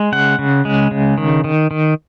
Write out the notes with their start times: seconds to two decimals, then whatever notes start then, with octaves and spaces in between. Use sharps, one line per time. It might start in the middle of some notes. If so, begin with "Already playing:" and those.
Already playing: G#3
0.12 C#3 F#5
0.39 C#3
0.65 G#3
0.91 C#3
1.18 D#3
1.44 D#3
1.71 D#3